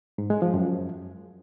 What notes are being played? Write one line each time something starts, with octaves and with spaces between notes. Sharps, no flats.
G#2
G#3
F3
F#2